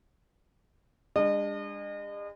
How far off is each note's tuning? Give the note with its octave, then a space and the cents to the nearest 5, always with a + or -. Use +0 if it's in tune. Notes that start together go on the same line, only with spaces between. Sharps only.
G#3 -40 D4 +0 D#5 -35